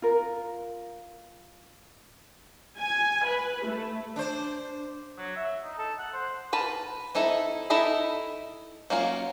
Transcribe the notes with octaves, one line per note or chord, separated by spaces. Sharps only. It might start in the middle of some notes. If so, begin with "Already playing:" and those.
F4 A#4
G#5
B4
A3
D4 C5
F#3
E5
D#4
A4
F#5
C5
A#4 B4 A5
C4 D#4 E4 A4
D#4 E4 A4 D#5 B5
F#3 A#3 C#4 F4